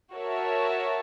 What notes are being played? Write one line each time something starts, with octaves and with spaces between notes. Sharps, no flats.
F#4 A#4 C#5 E5 A5